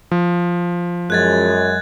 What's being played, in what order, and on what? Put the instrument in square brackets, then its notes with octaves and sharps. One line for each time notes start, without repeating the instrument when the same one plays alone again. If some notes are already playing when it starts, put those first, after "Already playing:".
[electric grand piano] F3
[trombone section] F#2 G#3 [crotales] F#6 G#6 A6